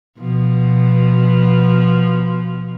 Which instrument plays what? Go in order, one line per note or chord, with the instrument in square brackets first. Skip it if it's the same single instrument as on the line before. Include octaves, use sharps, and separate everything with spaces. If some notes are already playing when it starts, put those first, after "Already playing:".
[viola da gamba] B2 F3